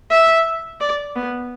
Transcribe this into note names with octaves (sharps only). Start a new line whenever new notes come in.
E5
D5
B3